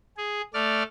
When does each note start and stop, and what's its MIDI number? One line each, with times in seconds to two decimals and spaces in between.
0.17 0.41 68
0.54 0.83 57
0.54 0.83 74
0.54 0.83 89